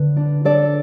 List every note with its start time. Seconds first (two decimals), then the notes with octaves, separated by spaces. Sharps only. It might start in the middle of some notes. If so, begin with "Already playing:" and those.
Already playing: D3 B4
0.16 D4
0.45 D4 A4 D5